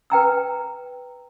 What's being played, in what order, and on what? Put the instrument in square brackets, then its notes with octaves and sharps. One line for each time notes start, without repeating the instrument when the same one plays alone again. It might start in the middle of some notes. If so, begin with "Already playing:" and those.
[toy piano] B4 G5 A#5 E6